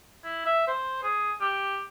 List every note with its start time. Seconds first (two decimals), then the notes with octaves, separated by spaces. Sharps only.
0.24 E4
0.46 E5
0.67 C5
1.03 G#4
1.41 G4